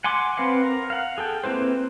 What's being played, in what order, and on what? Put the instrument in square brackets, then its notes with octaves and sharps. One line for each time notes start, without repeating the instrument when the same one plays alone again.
[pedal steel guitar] F#5 G#5 C6 D6
C4 B4 F5 F#5
A#4
F5 F#5
G#4 A4 G5
A#3 C4 E4 B4 C5